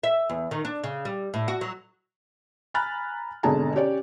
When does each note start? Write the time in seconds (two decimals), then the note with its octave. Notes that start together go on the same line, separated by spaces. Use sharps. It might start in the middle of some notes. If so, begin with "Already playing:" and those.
0.03 E5
0.29 E2
0.51 D#3
0.65 D4
0.84 C#3
1.05 G3
1.34 A2
1.48 F#4
1.61 F#3
2.74 G#5 A#5 B5 F6 F#6 A6
3.43 G#1 B2 D3 G#4 A5 A#5
3.75 C#4 G4 C#5 D5